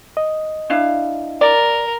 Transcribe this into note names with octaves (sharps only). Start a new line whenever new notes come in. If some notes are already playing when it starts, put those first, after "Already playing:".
D#5
D4 E4 F5
A#4 D5